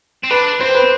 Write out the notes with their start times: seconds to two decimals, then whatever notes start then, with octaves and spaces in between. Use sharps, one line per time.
0.24 C4
0.31 D4 B4
0.60 C4 C5
0.75 B4